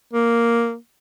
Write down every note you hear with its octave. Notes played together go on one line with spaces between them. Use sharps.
A#3